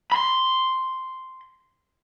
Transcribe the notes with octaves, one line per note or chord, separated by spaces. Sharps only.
B5 C6